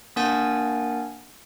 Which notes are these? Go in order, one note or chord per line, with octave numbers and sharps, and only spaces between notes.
A#3 D4 A#4 F#5 G#5 A6